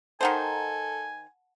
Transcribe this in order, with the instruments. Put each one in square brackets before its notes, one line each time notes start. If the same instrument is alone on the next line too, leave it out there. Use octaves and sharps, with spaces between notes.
[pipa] D#3 D#4 C5 [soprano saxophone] A4 [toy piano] F#5 A5 [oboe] G#5